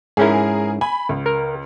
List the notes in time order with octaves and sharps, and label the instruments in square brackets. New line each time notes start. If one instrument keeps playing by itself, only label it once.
[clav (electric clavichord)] G#2 C#4 E4 [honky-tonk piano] G#4 A#4
[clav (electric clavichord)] G#5 [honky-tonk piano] B5
[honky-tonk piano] C#2
[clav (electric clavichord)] A#4